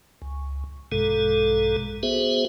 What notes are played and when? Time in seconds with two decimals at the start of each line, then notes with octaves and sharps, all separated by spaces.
0.22 C#2
0.92 A#1 G2 B2 G#3 A4
2.03 B3 F#4 G#4 C5 E5